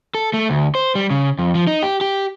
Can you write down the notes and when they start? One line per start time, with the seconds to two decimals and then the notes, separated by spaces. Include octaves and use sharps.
0.15 A4
0.34 A3
0.50 D2
0.75 C5
0.95 G3
1.11 C#3
1.39 F2
1.55 F3
1.67 D#4
1.83 G4
2.01 G4